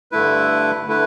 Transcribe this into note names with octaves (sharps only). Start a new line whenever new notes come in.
G2 D3 A3 E4 B4
D3 A3 E4 B4